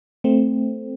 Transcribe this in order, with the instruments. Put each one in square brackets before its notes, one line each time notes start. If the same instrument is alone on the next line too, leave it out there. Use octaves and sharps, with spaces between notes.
[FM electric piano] A3 C4